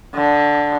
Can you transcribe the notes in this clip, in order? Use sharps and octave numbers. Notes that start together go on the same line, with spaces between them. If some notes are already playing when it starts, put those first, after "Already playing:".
D3